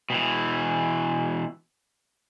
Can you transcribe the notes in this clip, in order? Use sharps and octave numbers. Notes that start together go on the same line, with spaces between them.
B2 E3